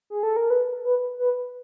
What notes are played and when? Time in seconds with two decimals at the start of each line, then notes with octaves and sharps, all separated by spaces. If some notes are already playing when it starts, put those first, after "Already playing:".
0.10 G#4
0.23 A4
0.37 A#4
0.50 B4
0.85 B4
1.19 B4